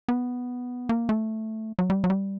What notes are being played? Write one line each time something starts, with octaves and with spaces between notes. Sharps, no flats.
B3
A#3
A3
F#3
G3
F#3
G3